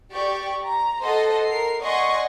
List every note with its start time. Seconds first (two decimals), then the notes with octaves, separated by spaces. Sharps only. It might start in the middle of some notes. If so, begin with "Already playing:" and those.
0.12 G4 D5 C#6
0.66 A#5
1.04 A4 C5 D#5 F#5 C6
1.49 A#4 C7
1.83 D5 D#5 F#5 G#5 C6 C#6